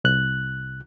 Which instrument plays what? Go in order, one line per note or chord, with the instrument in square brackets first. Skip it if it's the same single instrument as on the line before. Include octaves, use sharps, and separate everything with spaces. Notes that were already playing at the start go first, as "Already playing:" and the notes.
[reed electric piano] C2 F#6